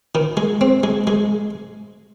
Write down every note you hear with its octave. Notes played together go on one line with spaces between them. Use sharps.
D#3
G#3
C4
G#3
G#3